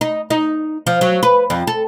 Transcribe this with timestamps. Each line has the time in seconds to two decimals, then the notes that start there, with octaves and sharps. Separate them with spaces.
0.01 D#4
0.30 D#4
0.87 F3
1.01 F#3
1.23 B4
1.50 F2
1.67 A4